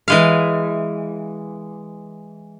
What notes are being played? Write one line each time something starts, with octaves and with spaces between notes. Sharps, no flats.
E3 G#3 F5